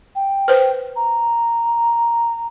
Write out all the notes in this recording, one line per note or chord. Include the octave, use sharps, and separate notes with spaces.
G5
B4 C5
A#5